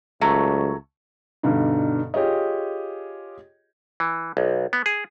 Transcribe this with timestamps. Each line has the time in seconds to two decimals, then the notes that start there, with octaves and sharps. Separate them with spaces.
0.21 C#2 F#3 A3
1.43 G2 B2 D3 D#4
2.14 F4 G4 G#4 C#5 D#5
4.00 E3
4.37 B1
4.73 B3
4.86 G#4